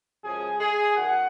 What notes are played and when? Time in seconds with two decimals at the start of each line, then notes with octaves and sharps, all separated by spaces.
0.24 F#2 C#3 F3 G#3 G#4
0.60 G#4
0.96 F#2 D#3 F#3 F#5